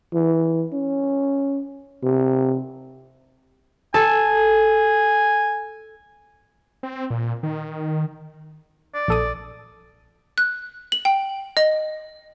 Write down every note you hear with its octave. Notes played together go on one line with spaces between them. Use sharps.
E3
C#4
C3
A4 G#5
C4
A#2
D#3
D5
A#1 A4 D#6
F#6
F#7
G5
D#5